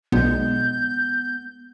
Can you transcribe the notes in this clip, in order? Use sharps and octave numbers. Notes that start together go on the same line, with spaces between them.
B1 G#3 B3 G6